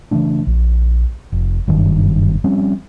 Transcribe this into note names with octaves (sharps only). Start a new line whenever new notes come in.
C#3 E3 A3 D4
A#1
F1
F#1 G2 D#3
F3 G3 C4 C#4